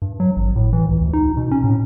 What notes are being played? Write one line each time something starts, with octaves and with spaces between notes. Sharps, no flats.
G2
F#3
G#1
A2
E3
C#2
D2
D#4
B2
C#4
A2